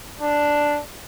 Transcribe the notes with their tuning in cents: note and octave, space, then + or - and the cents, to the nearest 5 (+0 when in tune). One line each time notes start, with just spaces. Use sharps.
D4 +0